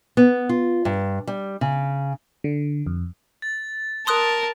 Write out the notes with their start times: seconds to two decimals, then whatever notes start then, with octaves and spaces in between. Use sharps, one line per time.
0.17 B3
0.49 F4
0.85 G2
1.27 G3
1.61 C#3
2.44 D3
2.86 F2
3.42 A6
4.07 A#4 A5 C6 D#6 F#6